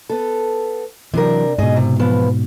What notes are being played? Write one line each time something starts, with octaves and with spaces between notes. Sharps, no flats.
B3 A4
C3 E3 F#3 D4 A#4
G#2 B2 G#4 D#5
C3
E3 F3 B3